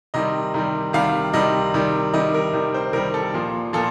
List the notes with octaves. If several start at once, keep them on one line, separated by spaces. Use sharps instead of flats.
C3 D#3 G3 D#5
C3 D#3 G3
C3 D#3 G3 F5
C3 D#3 G3 D#5
C3 D#3 G3
C3 D#3 G3 D#5
A#4
C3 D#3 G3
C5
C3 D#3 G3 A#4
A4
A#2 F3
A#2 F3 A4